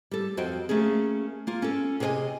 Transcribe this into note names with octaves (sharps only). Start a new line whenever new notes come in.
G3 A4
F2 F#4 C5 D#5 G5
A3 A#3 C#4 G#4
A#3 F4
C#4 A4
C3 G#4 A#4 C#5 D#5 G#5